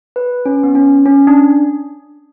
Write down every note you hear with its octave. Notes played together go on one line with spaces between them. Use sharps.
B4
C#4
B3
C#4
C#4
D4